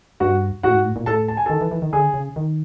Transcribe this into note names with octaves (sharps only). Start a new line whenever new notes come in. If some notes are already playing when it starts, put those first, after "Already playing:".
G2 F#4 F#5
A2 F#4 F#5
G#2
A2
A#2
A2 A4 A5
A5
G#5
D#3 A4 A5
E3
E3
D#3
D3 G#4 G#5
C#3
D#3